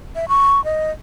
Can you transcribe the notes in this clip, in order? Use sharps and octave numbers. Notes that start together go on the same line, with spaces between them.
E5
C#6
D#5